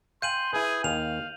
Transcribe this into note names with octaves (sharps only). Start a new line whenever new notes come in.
F5 G5 G#5 C6 G6 D#7 F#7
E4 G#4 B4
D#2 F5 F7